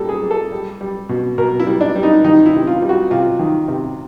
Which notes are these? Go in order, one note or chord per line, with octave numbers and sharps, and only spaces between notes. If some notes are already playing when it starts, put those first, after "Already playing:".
Already playing: A#2 G3 A4
G#4
G3
A4
G3
G3
B2
B2 A#4
E4
G3
D4
G3
D#4
D#3 D#4
E4
C3
F4
G3
F#4
C3 F4
D#3
C3